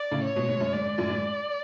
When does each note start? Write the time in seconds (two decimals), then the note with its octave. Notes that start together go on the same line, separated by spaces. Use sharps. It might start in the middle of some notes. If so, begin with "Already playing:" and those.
Already playing: D5
0.11 A2 C#3
0.24 C#5
0.36 G#2 B2
0.49 G#2
0.60 F#2
0.73 G#2 D5
0.85 G#2
0.98 F#2 A2
1.10 G#2